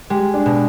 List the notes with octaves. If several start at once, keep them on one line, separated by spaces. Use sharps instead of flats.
G#3 G4
D4
B2